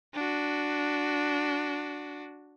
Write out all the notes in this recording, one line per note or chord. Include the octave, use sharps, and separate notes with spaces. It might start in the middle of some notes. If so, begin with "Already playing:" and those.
D4 F#4